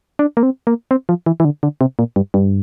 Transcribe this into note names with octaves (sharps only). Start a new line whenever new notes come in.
D4
A#3
C4
A#3
C4
F3
E3
E3
D3
D3
C3
A#2
G2
G2